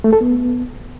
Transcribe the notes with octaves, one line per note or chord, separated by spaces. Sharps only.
A3
A4
B3